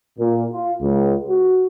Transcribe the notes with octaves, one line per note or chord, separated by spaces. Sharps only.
A#2
F4
C#2
F#4